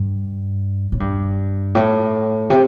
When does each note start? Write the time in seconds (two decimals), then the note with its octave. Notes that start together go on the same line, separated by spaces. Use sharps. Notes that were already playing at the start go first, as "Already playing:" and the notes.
Already playing: G2
0.92 A2
1.00 G2
1.75 A2
2.50 C3